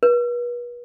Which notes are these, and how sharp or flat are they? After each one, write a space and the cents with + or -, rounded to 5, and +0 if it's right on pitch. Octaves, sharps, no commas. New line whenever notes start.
B4 -40